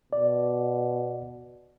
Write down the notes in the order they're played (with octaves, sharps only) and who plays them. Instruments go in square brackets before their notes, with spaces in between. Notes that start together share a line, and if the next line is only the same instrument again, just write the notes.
[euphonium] B2 [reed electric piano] D5